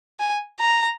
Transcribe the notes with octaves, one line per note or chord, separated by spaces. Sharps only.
G#5
A#5